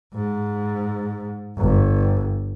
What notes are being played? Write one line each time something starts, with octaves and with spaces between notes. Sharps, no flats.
G#2
G1